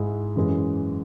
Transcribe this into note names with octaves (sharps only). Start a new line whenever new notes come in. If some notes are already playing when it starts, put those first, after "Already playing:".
Already playing: G#2 G#3 E4 G#4
F#2 E3 G#3